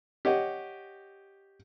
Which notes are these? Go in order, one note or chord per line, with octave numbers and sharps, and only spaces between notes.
G4 C#5 D#5 F#5